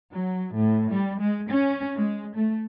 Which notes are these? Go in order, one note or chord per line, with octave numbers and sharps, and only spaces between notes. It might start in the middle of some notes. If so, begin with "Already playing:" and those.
F#3
A2
G3
G#3
C#4
G#3
A3